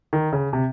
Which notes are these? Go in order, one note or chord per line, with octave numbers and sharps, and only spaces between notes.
D#3
C#3
C3